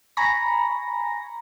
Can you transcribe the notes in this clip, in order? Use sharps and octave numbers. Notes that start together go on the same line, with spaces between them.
G#5 A#5 B5 C#6 A#6